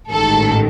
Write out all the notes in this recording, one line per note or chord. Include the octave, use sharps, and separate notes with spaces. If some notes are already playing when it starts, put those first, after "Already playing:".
A1 G#2 D#3 A4